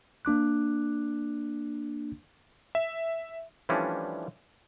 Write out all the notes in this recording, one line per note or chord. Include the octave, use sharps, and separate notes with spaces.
A#3 D4 D6 F#6
E5
E3 F3 G3 A3 C#4 D4